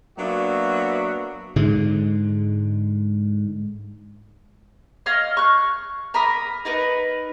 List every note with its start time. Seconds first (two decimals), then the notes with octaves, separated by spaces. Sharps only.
0.19 F#3 A#3 B3 D4 F#4 E5
1.56 G#2 D3 G#3
5.06 C#5 D#5 F5 F6
5.37 C#6 F#6
6.14 A#4 A#5 B5 D#6
6.65 D#4 A#4 B4